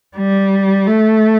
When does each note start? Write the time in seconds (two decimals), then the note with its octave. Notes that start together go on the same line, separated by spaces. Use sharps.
0.17 G3
0.87 A3